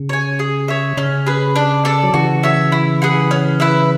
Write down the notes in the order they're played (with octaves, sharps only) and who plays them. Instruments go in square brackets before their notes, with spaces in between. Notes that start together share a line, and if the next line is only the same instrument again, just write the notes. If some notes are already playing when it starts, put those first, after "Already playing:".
Already playing: [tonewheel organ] C#3
[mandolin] C#5 G#5
G#4
C#5 E5
[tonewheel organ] C#3 [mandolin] C#4
[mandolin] G#4 B4
D4
A4 D5
[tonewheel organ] F#3
[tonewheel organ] C#3 E3 [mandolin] F#4
[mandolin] C#5 E5
E4
G#4 B4 F#5
C#4
E4 B4 E5